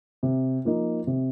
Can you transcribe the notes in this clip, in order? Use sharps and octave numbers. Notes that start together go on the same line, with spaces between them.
C3
F3 A#3 D#4
C3